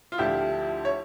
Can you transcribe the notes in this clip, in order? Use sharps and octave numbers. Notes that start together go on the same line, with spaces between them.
F4
D2 D3 F3 E4 G4
C#5